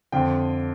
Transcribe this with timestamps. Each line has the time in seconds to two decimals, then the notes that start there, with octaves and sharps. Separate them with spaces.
0.12 F2 D3 G5